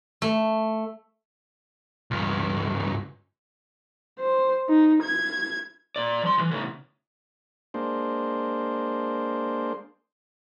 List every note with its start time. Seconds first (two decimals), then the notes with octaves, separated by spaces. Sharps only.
0.22 A3
2.11 C#2 G2
4.20 C5
4.69 D#4
5.03 G#6
5.96 A#2 D5
6.23 F3 C6
6.38 D2 E3
6.51 A2 C#3
7.74 G#3 A#3 D4 C5